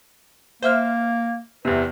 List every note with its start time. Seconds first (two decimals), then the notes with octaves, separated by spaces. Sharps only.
0.63 A#3 C5 E5 F6
1.65 E2 C3 B4